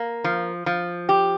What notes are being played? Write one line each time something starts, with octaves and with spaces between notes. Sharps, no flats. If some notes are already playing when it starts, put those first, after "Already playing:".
Already playing: A#3
F3
F3
G4